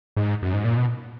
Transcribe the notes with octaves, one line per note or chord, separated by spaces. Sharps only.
G#2
F#2
G#2
A#2
B2